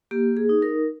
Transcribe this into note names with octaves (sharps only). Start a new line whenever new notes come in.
A#3 G4
G#4
D#4
A#4